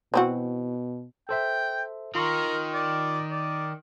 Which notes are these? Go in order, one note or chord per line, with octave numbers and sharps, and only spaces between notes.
B2 E3 C4 F#4
A4 C5 E5 G5
D#3 F4 A#4 C6 C#6
D5
D5